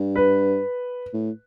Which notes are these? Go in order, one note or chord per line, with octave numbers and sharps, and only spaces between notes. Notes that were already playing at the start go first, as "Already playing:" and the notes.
Already playing: G2
B4
A2